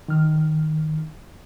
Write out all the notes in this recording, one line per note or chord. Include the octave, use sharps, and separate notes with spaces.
D#3 F6